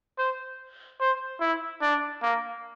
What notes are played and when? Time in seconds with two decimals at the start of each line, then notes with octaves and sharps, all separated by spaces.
0.18 C5
1.00 C5
1.41 E4
1.82 D4
2.22 A#3